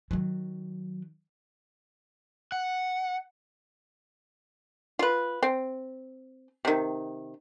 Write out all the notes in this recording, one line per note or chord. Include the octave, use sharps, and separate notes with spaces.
D#3 F#3
F#5
F4 B4
C4
C3 D#3